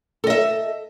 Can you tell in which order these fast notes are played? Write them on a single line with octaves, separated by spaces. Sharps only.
A4 D#5 E5